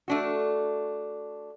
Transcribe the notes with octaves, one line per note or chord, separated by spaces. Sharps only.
A3 D4 F#4